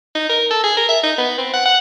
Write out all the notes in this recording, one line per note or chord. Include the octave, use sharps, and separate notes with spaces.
D#4
A#4
A4
G#4
A#4
E5
D#4
B3
C4
F#5
F#5